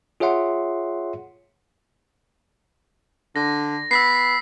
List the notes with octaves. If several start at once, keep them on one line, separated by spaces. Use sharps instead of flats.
F4 G#4 C#5 E5 F#5 C6
D3 A#6
B3 E6 B6 C7